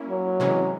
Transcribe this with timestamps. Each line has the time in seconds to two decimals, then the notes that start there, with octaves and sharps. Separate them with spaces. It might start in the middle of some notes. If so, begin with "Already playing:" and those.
Already playing: A#3 C#4 E4
0.09 F#3
0.40 C3 E3 G#3 C#4